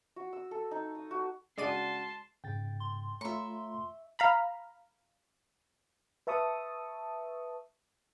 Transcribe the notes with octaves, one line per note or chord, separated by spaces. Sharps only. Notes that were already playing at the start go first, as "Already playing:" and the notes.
F#4
E6
A4
D#4
D#6
F#4
C#3 G#3 F#4 D5 A5 C6 D#7
G#2 C#3 G5 A6
C6
A3 F4 C#5 E5 A#5 B5 C#6
F5 A#5 B5
B4 E5 A5 C#6 D#6